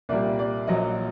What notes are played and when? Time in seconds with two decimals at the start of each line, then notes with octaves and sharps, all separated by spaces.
0.09 C2 A#2 G3 A#3 D5
0.39 D5
0.67 A#1 A#2 F#3 D#5